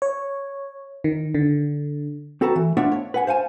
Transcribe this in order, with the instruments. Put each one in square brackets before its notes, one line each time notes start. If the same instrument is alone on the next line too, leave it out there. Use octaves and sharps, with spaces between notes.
[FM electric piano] C#5
D#3
D3
[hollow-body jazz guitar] C4 F#4 A4 B4 A5 A#5
E3
B3 D4 F4 C#5 E5 F#5
C#5
B4 F#5 G#5
C5 F5 F#5 G#5 A5